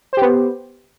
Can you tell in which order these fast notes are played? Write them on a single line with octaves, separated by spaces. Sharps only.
C5 G4 B3